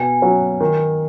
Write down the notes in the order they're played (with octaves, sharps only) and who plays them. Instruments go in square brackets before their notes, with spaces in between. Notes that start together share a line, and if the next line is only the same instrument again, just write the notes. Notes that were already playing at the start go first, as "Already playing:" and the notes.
Already playing: [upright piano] B2 [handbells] G#5
[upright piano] F#3 C#4 F#4
D#3